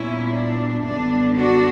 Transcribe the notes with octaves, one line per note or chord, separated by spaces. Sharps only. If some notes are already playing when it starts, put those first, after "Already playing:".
Already playing: A#2 G3 B3 C#4 E4
D4
F#2 D3 G3 B3 D4
D4 F#4